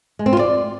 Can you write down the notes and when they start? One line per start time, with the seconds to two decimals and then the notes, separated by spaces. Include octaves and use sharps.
0.19 G#3
0.26 C4
0.33 F4
0.39 D5